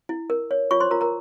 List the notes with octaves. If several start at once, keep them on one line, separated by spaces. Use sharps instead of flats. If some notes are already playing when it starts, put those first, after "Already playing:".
E4
A#4
C#5
F4 C#5 C#6
C5 C6
F4 A#4 A#5
A#4 A#5